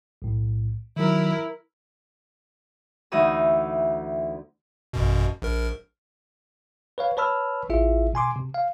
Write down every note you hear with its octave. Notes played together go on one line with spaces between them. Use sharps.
B1 A2
D#3 F#3 E4 A#4
D2 E3 D#4 F#4 D#6 E6
A1 F#2 B2
A#1 A#4
B4 C#5 F5
B4 C#5 A5 B5 E6 F6
A1 E4 F4 G#4 E5
B2 G#5 C6 D6
C3
F5